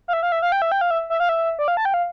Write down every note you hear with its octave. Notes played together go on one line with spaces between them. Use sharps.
F5
E5
F5
E5
F5
G5
E5
G5
F5
E5
E5
F5
E5
D5
F5
A5
G5
F5